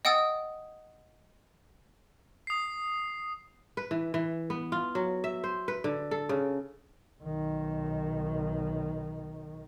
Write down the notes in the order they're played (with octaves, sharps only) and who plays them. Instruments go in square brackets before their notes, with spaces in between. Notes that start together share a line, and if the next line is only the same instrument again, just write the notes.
[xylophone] D#5 F#5 G5 D#6 E6 A6
[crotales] D#6 C7
[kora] B4
E3
E3
B3
F4
F#3
E5
C5
B4
D3
A4
C#3
[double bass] B1 D#3